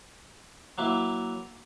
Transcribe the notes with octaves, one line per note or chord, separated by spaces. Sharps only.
F#3 A#3 E4